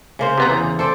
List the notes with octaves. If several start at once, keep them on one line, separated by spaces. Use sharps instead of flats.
C#3 A#3 C5
C3 B3 A#5
E2
A4 C5 D5